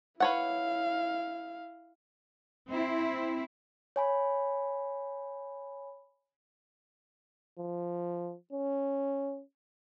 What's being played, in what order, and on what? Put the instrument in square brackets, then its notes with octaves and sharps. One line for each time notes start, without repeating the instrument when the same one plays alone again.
[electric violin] E4 F5 [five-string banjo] B4 C#5 F#5
[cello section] C4 E4
[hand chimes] C#5 G#5 B5
[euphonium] F3
C#4